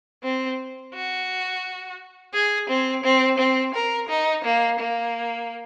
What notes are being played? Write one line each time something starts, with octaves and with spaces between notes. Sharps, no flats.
C4
F#4
G#4
C4
C4
C4
A#4
D#4
A#3
A#3